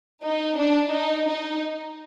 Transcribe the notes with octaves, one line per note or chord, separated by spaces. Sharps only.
D#4
D4
D#4
D#4